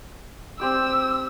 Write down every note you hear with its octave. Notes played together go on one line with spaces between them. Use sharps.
C4 G4 D5 E6